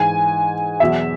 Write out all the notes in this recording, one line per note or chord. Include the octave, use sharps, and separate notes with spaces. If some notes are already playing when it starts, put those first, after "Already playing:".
Already playing: G#2 E3 G#5
E2 B2 F#3 E5